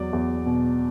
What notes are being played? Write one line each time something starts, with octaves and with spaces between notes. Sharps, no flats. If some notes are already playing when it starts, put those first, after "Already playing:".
Already playing: E2 F#3 D5
E2
B2